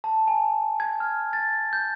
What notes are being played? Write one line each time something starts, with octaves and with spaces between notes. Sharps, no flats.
A5
G#5
G#6
F6
A6
G6